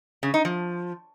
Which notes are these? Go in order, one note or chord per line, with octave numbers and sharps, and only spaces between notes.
C#3
D#4
F3